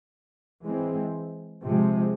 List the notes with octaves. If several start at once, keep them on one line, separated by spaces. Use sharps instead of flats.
E3 G#3 C4
C3 F3 G#3